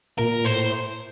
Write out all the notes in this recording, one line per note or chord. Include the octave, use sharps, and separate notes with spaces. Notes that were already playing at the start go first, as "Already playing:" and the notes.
A#2 A#4
A2 C5